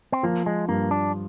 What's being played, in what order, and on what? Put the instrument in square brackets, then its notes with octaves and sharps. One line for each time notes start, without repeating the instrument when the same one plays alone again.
[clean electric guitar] C4
[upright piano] F3 [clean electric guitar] A#3
[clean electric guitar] G#3
[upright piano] G2 [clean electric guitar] A#3
[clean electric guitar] D4